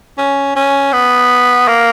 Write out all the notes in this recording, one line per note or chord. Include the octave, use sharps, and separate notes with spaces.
C#4
C#4
B3
A#3